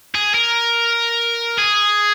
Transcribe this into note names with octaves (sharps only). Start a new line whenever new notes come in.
G#4
A#4
G#4